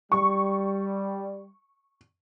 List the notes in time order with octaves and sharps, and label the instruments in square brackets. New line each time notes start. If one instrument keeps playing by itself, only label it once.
[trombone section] G3 [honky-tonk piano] C#6